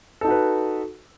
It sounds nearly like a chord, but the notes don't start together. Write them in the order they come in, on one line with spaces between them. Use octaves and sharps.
A4 D#4 F#4 B4